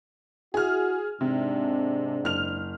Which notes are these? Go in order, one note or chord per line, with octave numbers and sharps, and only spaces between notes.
E4 F#4 G#4 F6
G#2 C3 D4
F#1 F6 F7